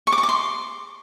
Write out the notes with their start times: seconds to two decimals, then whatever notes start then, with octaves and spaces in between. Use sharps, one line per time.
0.07 C#6
0.12 D6
0.18 C#6
0.23 D6
0.29 C6